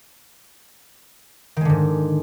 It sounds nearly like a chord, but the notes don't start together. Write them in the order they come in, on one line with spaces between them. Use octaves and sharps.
D#3 G#3 D3 G#2